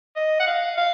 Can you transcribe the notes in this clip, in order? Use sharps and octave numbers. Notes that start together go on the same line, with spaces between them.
D#5
F#5
F5
F5